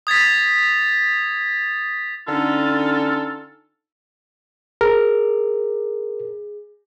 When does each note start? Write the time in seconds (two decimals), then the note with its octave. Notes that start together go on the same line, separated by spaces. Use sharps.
0.07 D#6 G#6 A6 B6
2.28 D3 C#4 D#4 F4 A4
4.81 G#4 A#4